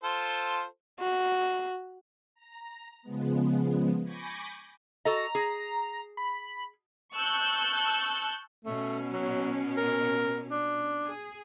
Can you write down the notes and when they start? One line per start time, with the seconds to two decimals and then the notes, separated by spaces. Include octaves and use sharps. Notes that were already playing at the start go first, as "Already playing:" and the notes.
0.04 F4 A4 C5
1.00 F#4
2.35 A#5
3.02 C#3 F3 G#3 B3
4.03 G#5 B5 C#6 D6 G6 A#6
5.05 F#4 A4 D#5 A#5
5.35 G#4
6.17 B5
7.13 A5 C#6 E6 F#6 G6
8.65 B2 A3 C#4
9.12 F#3
9.77 A#4
10.50 D4
11.06 G#4